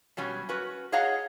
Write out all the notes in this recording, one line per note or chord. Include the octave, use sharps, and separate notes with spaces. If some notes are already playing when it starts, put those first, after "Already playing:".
B2 F#3 G3 C#4
C#4 F#4 B4
G#4 C#5 D#5 F5 F#5 A#5